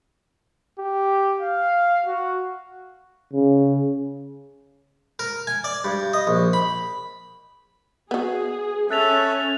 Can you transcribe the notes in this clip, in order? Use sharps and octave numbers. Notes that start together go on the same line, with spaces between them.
G4
F5
F#4
C#3
A#4
G#5
D5
G2
D#5
A#1
B5
B3 F#4 G#4
C#4 A4 E5 F#6 A6 F7